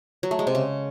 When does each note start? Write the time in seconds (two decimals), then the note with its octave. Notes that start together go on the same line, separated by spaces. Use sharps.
0.23 F#3
0.31 A3
0.39 G#3
0.47 C3
0.55 C#3